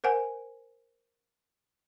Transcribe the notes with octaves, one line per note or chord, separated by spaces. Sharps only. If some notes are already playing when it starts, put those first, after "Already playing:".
A#4 C5 F#5 G#5